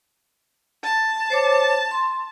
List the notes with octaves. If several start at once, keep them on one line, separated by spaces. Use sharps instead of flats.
A5
C5 C#5 D6
C6